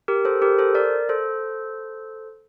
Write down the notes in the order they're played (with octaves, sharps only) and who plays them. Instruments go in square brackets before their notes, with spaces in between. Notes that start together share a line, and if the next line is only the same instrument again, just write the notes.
[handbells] G4 A#4
A4 C5
G4 A#4
A4 C5
A#4 D5
A4 C5